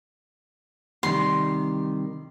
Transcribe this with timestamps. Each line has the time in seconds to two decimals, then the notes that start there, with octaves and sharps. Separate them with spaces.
1.03 C3 D#3 G3 C6